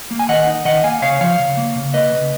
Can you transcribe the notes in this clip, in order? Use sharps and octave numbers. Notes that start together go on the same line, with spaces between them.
A#3
G#5
D#3 D#5 F#5
D#4
D#3 D#5 F#5
A#3 F5 G#5
C#3 C#5 F5
F3 C#5 F5
C#3
A#3
C#3
A#3 B4 D#5
C#3